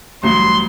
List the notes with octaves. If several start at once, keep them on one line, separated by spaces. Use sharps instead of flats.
A1 G2 F#3 C6